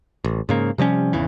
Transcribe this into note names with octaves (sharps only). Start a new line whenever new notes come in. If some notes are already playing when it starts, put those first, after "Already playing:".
A1
G#2 C#3 A#3
C3 F3 G3 C#4
G#1 E2 C#3 E3